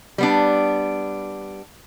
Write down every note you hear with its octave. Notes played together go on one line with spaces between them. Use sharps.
G3 B3 D4